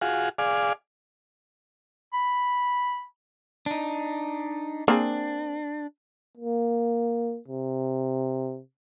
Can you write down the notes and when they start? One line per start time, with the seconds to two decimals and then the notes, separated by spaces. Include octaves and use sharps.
0.02 F4 F#4 G#4
0.38 G#4 D5 F5
2.13 B5
3.66 D4 D#4
4.88 A#3 C4 D4 G#4
6.37 A#3
7.48 C3